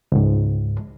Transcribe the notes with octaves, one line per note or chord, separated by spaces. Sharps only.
C#2 G#2